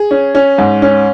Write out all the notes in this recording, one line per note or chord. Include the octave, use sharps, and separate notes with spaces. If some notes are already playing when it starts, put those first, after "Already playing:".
Already playing: G#4
C#4
C#4
G#2
C#4